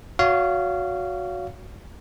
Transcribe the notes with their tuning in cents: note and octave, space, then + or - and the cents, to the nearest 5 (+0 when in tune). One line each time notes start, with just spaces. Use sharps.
F#4 -15 C#5 +30 F5 -20